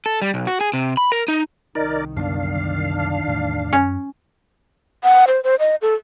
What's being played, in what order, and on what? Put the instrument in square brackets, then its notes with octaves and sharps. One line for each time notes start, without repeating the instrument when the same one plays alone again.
[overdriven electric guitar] A4
G3
B1
F#4
G#4
C3
B5
A#4
D#4
[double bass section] C2 D#3 [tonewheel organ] D#4 A#4 D5
[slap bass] F#2 D3 B3 [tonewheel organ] D4 F5
[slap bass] E2 A2
[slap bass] F#2 [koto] C#4
[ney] F#5
C5
C5
D#5
A4